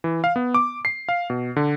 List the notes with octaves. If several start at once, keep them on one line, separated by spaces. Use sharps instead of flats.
E3
F5
B3
D6
C7
F5
B2
D3